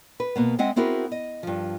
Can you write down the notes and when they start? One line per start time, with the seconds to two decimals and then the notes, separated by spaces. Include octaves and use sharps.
0.20 B4
0.36 B2 A#3 B3
0.59 G#3 C4 D#5 E5 F#5
0.76 B3 C4 E4 F#4 G#4 A#4
1.12 D#5
1.43 G2 F3